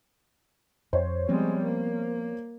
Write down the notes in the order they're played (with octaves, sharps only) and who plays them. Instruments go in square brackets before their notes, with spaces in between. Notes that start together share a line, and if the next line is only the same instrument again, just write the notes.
[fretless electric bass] F2 [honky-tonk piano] C5 C#5
[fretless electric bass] F3 B3 C4 [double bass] G3 G#3
[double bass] A#3